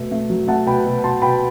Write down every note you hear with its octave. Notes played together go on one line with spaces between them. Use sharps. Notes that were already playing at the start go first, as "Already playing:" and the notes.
Already playing: B2 A3 E5
A3
F#3
A3 F#5 A5
B2 G5 B5
B2
B2 A5 C6
B2 G5 B5